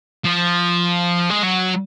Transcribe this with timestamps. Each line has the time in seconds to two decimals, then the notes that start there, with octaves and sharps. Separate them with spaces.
0.24 F3
1.30 G#3
1.43 F#3